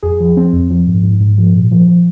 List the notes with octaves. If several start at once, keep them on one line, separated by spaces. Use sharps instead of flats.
F2 G#4
F3
F3 C4
F2
F3
G#2
G#2
G#2
F3
A#2
F3
F3